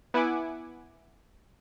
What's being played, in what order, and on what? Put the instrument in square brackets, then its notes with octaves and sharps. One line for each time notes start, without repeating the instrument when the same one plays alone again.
[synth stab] B3 E4 F#5 G#5 D6